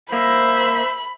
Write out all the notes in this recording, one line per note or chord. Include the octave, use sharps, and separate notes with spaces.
A#3 C5 E5 B5